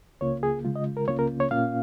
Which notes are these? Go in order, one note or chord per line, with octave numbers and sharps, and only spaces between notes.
C#2 C#3 A#3 F4 C#5
G#4
C#3 G#3 F4
D#5
A#4
C#2 C#3 A#3 C#4 F4 C#5
A#4
C#5
A#2 A#3 C#4 F4 F5